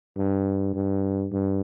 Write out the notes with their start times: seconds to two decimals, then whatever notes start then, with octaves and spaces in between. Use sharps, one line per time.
0.17 G2
0.75 G2
1.33 G2